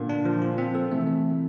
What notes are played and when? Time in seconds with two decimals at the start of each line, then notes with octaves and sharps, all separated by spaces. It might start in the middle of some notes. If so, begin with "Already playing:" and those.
Already playing: A#2 D3
0.09 D4
0.25 F3
0.42 F4
0.58 C4
0.75 A4
0.91 C3 E3 A3
1.07 A3